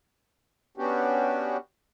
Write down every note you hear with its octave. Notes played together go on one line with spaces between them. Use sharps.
B3 C#4 D4 F#4 G4